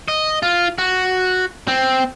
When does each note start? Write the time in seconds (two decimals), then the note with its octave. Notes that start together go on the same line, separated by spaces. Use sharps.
0.08 D#5
0.43 F4
0.78 F#4
1.68 C4